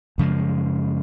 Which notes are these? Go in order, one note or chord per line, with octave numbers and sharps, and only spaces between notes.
F#2 C#3 F3 G#3